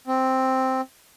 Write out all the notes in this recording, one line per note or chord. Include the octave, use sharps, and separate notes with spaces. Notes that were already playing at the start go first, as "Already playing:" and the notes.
C4